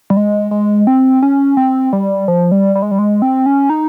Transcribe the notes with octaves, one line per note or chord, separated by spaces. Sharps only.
G3
G#3
G#3
C4
C#4
C4
G3
F3
G3
G3
G#3
G3
G#3
C4
C#4
D#4